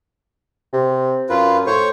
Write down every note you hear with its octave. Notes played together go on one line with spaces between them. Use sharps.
C3
F#2 F4 B4
A2 C5 C#5 C#6